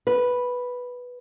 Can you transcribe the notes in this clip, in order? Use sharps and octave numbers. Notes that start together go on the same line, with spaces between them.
B4